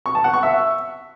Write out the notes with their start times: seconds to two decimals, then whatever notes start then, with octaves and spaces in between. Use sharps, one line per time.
0.06 C#6
0.15 A5
0.24 F#5
0.34 C#6
0.43 E5